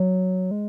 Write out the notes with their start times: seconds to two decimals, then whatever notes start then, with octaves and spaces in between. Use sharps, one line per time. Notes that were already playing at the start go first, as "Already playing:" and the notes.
Already playing: F#3
0.51 G#3